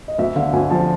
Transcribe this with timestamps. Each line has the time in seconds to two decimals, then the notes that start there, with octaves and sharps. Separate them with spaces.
0.08 D#5
0.18 D2 E5
0.36 D3 F5
0.53 D2 G#5
0.70 F3 A5